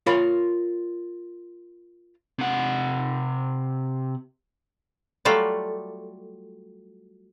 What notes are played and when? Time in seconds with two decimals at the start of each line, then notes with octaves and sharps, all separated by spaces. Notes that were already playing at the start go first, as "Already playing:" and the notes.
0.06 F4 A#4 C#5 B5
2.39 C3 F#5
5.25 F#3 G3 A3 F4 A4 D5